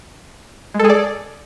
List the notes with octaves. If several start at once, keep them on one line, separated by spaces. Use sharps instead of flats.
G#3
A4
G#4
D5